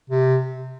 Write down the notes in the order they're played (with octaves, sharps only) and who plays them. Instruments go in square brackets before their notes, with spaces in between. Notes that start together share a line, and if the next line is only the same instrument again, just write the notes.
[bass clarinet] C3